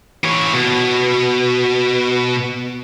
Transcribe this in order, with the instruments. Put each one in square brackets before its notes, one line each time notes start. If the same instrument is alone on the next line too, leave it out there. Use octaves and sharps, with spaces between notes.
[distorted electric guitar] E3 C#5
B2